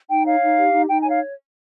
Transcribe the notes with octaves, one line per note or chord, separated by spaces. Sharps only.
D#4 G5
C#5 F5
D#4
G4
D#4
D#4 G5
C#5 G#5
F5